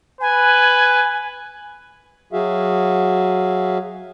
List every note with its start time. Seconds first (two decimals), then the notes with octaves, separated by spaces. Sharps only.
0.21 B4 G#5
2.33 F#3 F#4 G#4 E5 F5